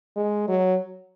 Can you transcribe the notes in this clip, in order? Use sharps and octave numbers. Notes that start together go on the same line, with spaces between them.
G#3
F#3